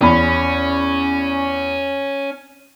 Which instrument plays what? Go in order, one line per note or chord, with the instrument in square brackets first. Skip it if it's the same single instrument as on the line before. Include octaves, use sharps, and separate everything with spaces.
[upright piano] E2 B5 [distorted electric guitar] C#4